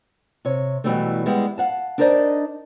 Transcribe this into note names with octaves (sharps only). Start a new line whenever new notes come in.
C3 C#5
B2 E3 F#3 G3 A3
G3 G#3 B3 E4
F5 F#5 A5
D4 D#4 A#4 C5 D5 D#5